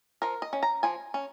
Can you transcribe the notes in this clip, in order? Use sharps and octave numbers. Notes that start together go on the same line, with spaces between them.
F3 A#4
D#5
C#4
A#5
F3 G#5
C#4